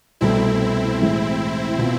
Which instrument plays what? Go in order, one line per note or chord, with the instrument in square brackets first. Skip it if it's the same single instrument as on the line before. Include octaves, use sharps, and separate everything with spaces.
[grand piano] C2 B2 A3 [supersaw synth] C4 E4
[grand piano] A2 E3 G#3
B2 B3 F4